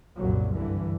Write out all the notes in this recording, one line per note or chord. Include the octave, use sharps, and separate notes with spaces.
F#1 C2 F#2 A#2 F#3
G2 D3 E3